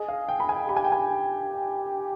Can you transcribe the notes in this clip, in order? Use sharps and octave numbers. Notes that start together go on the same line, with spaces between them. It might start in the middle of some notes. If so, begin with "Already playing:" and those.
Already playing: G#4 D#5
F5
G5
B5
G#5
G4 B5
G#5
G5
G#5